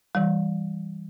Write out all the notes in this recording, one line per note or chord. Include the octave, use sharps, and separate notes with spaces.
E3 G3